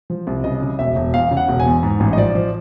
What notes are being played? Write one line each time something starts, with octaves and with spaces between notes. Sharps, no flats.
F3
C2
C#3 D#5
C#3
E1 E5
E1
E2 F5
C#3
F#5
E1
G#5
E2
G#2
A1
D#5
F3 D5
F3